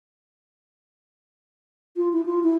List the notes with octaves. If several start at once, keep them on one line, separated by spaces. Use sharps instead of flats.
F4
E4
F4
E4